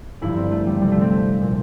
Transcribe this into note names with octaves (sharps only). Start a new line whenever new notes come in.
G1 G2 D3 F3 E4
C4
A3
G3
D2 C3 F3 G3
A3
C4
A#2 F3